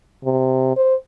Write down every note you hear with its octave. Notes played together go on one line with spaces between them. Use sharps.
C3
C5